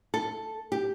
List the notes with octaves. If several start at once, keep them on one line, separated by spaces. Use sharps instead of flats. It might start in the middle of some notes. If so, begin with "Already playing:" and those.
A4
G4